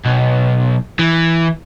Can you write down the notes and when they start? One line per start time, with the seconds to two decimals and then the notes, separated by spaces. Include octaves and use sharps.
0.05 B1
0.99 E3